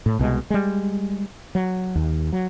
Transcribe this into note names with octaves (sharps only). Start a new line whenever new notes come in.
A2
C2 B2 G#3
G3 G#3
F#3
D#2
F#3